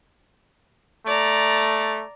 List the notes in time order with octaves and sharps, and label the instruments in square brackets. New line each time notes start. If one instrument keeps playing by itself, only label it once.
[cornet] A3 [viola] D5 A#5